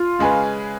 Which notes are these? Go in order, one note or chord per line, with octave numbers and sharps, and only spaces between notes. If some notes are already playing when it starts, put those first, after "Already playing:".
Already playing: F4
C#3 G#3 C#4 G#4 B4